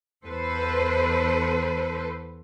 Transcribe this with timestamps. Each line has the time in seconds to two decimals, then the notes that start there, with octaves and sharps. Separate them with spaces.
0.25 E2 A4 B4 C5